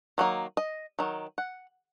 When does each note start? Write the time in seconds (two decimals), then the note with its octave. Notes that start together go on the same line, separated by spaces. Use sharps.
0.18 D#3 F#3 A#3
0.57 D#5
0.99 D#3 F#3
1.38 F#5